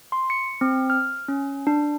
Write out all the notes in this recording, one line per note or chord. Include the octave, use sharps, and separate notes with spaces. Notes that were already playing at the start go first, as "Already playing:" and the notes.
C6
C#7
C4
F6
C#4
D4